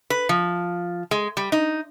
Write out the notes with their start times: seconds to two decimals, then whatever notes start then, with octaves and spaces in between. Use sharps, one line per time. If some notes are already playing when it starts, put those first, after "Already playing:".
0.10 B4
0.29 F3
1.11 G#3
1.37 G3
1.52 D#4